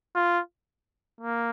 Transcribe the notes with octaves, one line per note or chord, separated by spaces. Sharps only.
F4
A#3